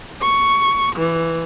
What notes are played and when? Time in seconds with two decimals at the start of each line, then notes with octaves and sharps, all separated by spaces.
0.22 C#6
0.96 E3